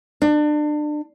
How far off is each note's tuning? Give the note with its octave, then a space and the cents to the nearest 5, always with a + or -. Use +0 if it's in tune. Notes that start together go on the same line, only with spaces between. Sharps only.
D4 +30